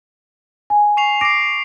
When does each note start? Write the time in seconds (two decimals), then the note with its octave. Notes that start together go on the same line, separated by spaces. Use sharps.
0.70 G#5
0.97 C#6 C7 F7
1.21 D6 A#6 C7 D7